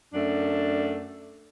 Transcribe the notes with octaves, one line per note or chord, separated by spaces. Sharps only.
F#2 A3 D4